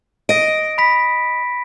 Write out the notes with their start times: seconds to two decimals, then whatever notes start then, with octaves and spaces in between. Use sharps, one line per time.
0.29 D#5 A#6 D7
0.78 B5 B6